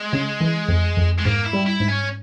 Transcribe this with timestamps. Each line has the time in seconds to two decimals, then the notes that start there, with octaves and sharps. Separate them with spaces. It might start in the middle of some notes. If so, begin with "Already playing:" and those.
Already playing: G#3
0.13 C#3
0.41 E3
0.68 F2
0.97 F2
1.19 G#3
1.24 G#2 A#3
1.45 E4
1.53 G3
1.66 E4
1.80 G#2
1.88 C#4